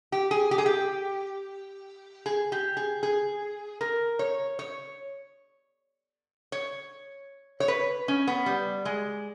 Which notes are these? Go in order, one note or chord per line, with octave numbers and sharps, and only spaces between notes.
G4
G#4
G4
G#4
G4
G#4
G4
G#4
G#4
A#4
C#5
C#5
C#5
C#5
B4
C#4
B3
G3
G#3